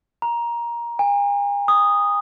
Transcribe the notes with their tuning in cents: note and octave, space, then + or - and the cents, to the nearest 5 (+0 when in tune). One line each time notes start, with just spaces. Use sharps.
A#5 +15
G#5 -45
D#6 -5